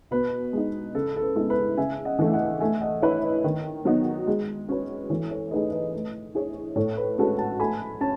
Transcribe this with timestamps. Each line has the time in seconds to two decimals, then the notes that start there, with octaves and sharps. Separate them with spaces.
0.11 B2 B4
0.53 G#3 D#4
0.95 C#3 A4
1.16 A4
1.22 B4
1.36 G#3 B3 E4 G#4
1.50 B4
1.77 C#3 E5 G#5
2.05 D#5 F#5
2.19 E3 A3
2.27 E5
2.33 D#5 F#5
2.60 A3 E5 G#5
2.81 D#5 F#5
3.02 E4 B4 C#5 E5
3.23 B4 D#5
3.44 D#3
3.85 F#3 B3 D#4 F#4
4.27 G#3
4.69 C#4 F#4 B4
5.10 E3 A4 C#5
5.31 A4 C#5
5.51 A3 D#4 G#4 B4 D#5
5.72 B4 D#5
5.93 A3
6.35 E4 G#4 C#5
6.76 A2 A4 C#5
6.97 B4
7.18 G#3 C#4 F#4 A4 B4
7.38 F#5 A5
7.60 A3 G#5 B5
8.01 C#4 A5